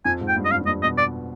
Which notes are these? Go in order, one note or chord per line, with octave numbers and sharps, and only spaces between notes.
F2 G#5
G#2
G5
G2
D#5
F2 F5
F2
G2 D#5
B2 D#5
D5